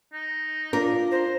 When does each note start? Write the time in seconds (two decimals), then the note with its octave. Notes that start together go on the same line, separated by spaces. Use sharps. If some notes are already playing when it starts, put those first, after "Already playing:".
0.13 D#4
0.73 D4 F4 A#4 A#5
1.11 C5 A#5